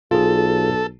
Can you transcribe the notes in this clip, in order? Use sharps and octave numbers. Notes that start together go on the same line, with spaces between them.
B1 F4 G#4 A4